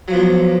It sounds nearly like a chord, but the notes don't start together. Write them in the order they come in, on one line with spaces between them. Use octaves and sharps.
F#3 F3 B3 A#3